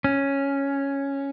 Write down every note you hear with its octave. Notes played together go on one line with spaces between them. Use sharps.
C#4